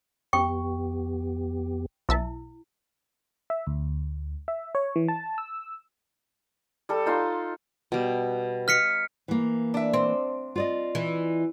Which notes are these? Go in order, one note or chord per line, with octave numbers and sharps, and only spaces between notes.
F2 B3 G4 G5 C#6
B1 E4 E5 A5
E5
D2
E5
C#5
E3
A5
E6
G3 A4
D#4 F4 A5 C6
B2 G3
D#5 F5 A#5 F6 B6 C#7
E3 A#3
D4 E5
C4
F4 D5 D#5
E3